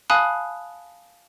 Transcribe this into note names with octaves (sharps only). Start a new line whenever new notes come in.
F5 G#5 A5 B5 D#6 F#6